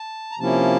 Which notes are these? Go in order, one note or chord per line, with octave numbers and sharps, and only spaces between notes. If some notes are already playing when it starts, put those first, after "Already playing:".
Already playing: A5
A#5
C3 F3 A#3 C#4 E4 A5